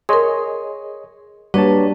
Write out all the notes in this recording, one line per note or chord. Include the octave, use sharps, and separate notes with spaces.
G#4 A#4 C#5 D#5 C6
G3 A#3 D4 F#4 B4 C#5 A5